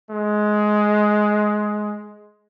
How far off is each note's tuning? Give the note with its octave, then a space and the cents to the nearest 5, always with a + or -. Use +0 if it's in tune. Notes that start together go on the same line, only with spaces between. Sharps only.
G#3 +15